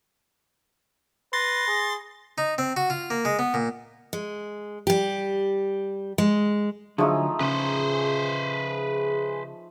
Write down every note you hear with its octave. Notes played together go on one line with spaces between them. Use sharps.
B4 C6 A6 A#6
G#4
D#4
C4
F#4
F4
A#3
G#3
B3
A#2
G#3
G3 G4
G#3
D3 F3 F#3 A3 D#4 G#4
C#3 B4 C5